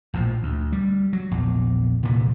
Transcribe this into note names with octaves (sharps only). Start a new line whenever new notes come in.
A#1 A2 F3
D2
G3
F#3
A#1 E2
C2 A#2 D3 E3